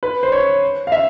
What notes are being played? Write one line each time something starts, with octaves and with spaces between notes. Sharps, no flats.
B4
C5
C#5
F5
E5